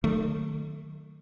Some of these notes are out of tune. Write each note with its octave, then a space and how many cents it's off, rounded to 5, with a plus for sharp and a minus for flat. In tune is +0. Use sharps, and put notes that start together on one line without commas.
D#3 -35 F#3 -10 A3 +0